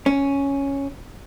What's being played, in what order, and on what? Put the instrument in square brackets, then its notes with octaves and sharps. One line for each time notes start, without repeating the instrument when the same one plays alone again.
[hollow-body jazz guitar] C#4